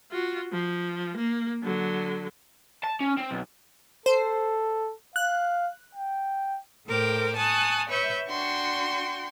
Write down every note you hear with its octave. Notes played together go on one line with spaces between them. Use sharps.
F4 F#4
F3
A#3
D3 F#3
A5
C#4
C4
B1
A4 C5
F5 F#6
G5
A2 A3 A#4 C5 G5 D6
G#5 A5 C#6 D#6 F#6
B4 C#5 E5 C#6 G6
D4 F#4 G5 C6 C#6